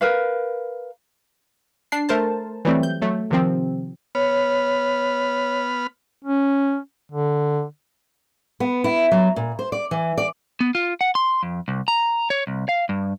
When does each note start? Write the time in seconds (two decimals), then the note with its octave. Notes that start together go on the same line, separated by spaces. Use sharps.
0.01 A#4 B4 F5
1.92 D4 C7
2.09 A3 A#4 C5 A5
2.65 E3 F#3 G3 A3 C4
2.83 G6
3.02 F#3 A3
3.31 C3 D#3 F3 C4
4.15 B3 C#5 B5 F6
6.24 C#4
7.12 D3
8.60 B3
8.84 E4
9.11 F#3
9.36 A#2
9.59 C5
9.72 D5
9.91 E3
10.18 D5
10.61 B3
10.75 F4
11.01 F#5
11.15 C6
11.43 F2
11.68 C2
11.88 A#5
12.30 C#5
12.47 C2
12.69 F5
12.89 G2